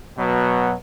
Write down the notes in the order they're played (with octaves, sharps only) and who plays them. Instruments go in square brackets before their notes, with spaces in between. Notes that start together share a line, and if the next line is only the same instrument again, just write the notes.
[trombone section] B2 F#3 B3